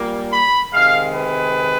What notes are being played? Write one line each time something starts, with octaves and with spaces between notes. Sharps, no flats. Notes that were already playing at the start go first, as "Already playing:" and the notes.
Already playing: A#2 G3 A#3
B5
C3 D#3 G#3 F5
B4